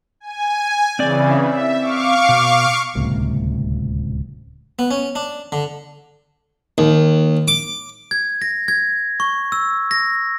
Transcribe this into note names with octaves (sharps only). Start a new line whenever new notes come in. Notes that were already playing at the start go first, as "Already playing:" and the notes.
G#5
C#3 E3 C4 D5
E5
F5 C#6 D6
B2
D1 C#2 C3 A#3
B3
C#4
D4
D3
D#2
D6
G#6
A#6
G#6
C#6
E6
A#6